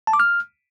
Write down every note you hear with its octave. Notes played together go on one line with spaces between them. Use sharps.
A5
D6
F6